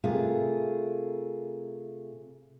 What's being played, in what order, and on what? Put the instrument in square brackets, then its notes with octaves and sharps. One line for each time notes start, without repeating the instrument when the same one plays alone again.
[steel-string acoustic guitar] C3 A3 F4 G#4 A#4